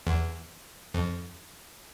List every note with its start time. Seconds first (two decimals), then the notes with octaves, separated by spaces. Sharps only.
0.07 E2
0.94 F2